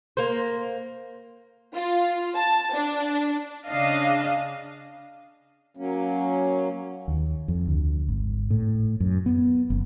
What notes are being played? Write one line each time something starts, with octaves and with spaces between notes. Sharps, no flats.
A#3 C5
F4
A5
D4
C#3 D4 D#5 F5
F#3 A#3 C#4
D#2
F2
D2
G#1
A2
F#2
B3
F#1